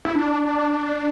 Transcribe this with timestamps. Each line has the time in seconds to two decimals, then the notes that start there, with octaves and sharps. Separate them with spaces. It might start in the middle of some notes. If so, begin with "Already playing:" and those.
0.05 E4
0.15 D4